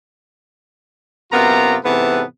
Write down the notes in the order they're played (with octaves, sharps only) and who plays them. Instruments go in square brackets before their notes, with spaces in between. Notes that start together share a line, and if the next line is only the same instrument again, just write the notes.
[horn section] F#2 C3 A#3 B3 F4 A#5
G#2 C3 E3 B3 A4 B4